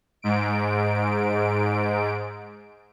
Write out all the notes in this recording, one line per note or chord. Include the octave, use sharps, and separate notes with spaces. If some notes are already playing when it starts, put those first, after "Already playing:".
G#2 D7